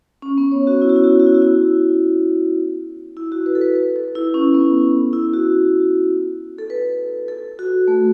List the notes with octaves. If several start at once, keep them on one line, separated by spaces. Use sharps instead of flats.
C#4
B3
C#5
F#4
E4
F#4
E4
F#4
E4
F#4
E4
F#4
E4
E4
F#4
B4
A4
B4
B4
A4
E4
C#4
B3
E4
F#4
A4
B4
A4
F#4
A3